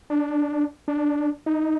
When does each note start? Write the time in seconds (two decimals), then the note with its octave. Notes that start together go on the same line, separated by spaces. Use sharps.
0.10 D4
0.88 D4
1.46 D#4